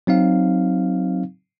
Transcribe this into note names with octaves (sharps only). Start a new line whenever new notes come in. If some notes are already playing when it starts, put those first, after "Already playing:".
F#3 C4 D#4 F5